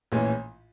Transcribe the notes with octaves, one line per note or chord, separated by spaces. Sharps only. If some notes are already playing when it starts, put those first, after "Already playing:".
A#1 A2 E3 G#3 C#4